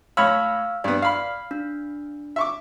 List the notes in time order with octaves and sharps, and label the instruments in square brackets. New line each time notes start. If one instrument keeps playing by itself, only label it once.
[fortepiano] A2 C#5 B5 [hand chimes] F5 E6 F6
[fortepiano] G2 B3 [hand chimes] D5
[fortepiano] F5 B5
[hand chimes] D4
[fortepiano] E5 C#6 D6